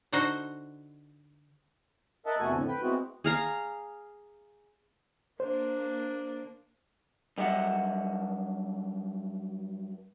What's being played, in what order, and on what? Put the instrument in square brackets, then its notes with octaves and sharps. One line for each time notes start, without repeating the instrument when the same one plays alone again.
[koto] D3 D#4 F#4 C5
[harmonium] A#4 D#5 E5 F#5 A5
E2 C3 A3 F#4 A4 G#5
F2 A2 D3 F3
B4 G5
G#3 B3 C4 E4 F#4
[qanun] G#4 F5 A#5
[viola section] A#3 D4 [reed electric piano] C5
[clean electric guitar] F#2 G3 D#5 E5 F#5